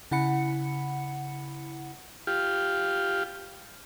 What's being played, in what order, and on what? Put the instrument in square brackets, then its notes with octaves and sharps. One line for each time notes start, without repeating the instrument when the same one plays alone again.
[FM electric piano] C#3 E4 F#5 B5 C#7
[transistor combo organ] F4 G4